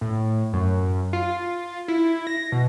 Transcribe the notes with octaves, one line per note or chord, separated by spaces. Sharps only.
A2
F#2
F4
E4
A#6
B2